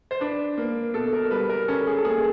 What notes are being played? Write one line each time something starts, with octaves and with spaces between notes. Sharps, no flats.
C5
D4 B4
A#3
B2 A4
A#4
G3 B4
A#4
C#4 A4
G#4
A4
A#3 G#4